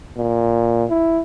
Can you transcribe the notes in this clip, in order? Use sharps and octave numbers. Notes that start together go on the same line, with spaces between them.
A#2
E4